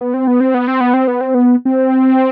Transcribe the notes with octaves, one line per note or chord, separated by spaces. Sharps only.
B3
C4
B3
C4
B3
C4
B3
C4
B3
C4
B3
C4